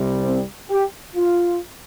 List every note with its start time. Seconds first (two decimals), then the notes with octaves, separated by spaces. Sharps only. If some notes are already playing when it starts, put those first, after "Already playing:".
Already playing: C2 C3 G3
0.24 C4
0.70 G4
1.15 F4